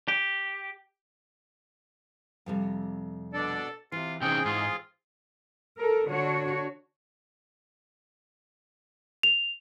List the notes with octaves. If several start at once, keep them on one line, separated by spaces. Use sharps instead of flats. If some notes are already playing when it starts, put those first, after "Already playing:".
G4
F2 C3 G3
B2 D4 A4 D5
C3 E3 F4
C3 C4 C#4 D#4 G#4 G5
G#2 F4
A4 A#4
D3 D4 F#4 C#5
F7